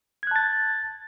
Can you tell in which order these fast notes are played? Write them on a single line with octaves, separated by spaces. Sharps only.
G#6 F#6 A5 A6